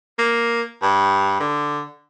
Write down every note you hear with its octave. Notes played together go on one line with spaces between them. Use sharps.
A#3
G2
D3